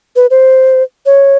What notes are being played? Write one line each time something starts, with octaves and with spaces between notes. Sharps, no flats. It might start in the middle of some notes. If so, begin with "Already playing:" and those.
B4
C5
C#5